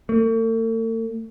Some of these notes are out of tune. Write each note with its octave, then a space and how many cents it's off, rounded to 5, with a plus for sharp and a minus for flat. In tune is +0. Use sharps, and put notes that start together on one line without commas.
A3 +45